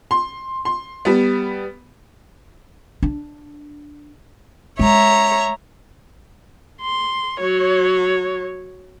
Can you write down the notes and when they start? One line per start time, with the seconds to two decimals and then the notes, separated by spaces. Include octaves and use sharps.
0.11 C6
0.65 C6
1.05 G3 B3
3.02 D4
4.79 G#3 C#5 E5 A#5
6.81 C6
7.40 F#3 C#5